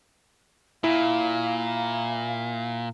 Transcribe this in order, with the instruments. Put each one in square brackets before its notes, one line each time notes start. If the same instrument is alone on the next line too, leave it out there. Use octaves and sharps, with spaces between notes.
[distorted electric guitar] A#2 [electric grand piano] E4 [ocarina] F5